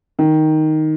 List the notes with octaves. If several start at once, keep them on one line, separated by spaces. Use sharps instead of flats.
D#3